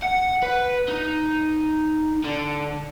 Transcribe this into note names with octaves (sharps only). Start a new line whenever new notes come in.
F#5
B4
D#4
D3